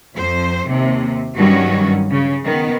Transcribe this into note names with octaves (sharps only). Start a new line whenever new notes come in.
F2 C5
D#2 C3
G2 D#3 F#3 G3 C#4 F#4
C#3
D#3 B3